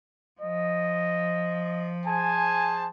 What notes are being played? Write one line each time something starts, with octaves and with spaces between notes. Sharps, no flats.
F3 D#5
G#4 C5 G#5 A5